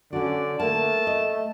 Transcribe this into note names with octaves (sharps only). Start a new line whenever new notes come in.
D3 C#4 F#4 D5
A3 A#3 A5
D#5